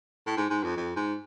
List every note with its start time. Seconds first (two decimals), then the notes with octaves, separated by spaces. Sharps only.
0.26 A2
0.37 G#2
0.50 G#2
0.64 F2
0.76 F2
0.96 G#2